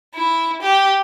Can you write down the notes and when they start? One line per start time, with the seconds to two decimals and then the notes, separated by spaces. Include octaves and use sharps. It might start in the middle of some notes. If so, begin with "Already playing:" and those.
0.15 E4
0.62 G4